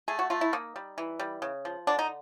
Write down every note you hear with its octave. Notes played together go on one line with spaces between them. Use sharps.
A3 G#4
F#4
A3 F4
E4
A#3 D#4
G3
E3
G3
C#3
F3
D3 D4
D#4